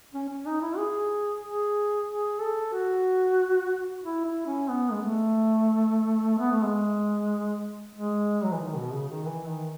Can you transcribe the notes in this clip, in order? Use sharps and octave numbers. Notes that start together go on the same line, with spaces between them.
C#4
C#4
D#4
E4
G#4
G#4
G#4
A4
F#4
E4
E4
C#4
B3
G#3
A3
B3
A3
G#3
G#3
F#3
E3
D#3
B2
C#3
D#3
E3
D#3